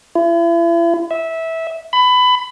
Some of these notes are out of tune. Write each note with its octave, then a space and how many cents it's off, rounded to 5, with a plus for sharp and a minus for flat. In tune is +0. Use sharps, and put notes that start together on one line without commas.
E4 +40
E5 -15
B5 +20